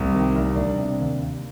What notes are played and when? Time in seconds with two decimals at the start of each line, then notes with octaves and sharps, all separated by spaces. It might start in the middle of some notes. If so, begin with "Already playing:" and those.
Already playing: C2 C4
0.14 D#3
0.36 C2
0.56 C2 D4
0.78 C3
0.99 D#2
1.19 D#2